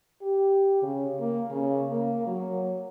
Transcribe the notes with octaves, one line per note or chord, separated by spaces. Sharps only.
G4
C#3
A#3
C#3
A#3
F#3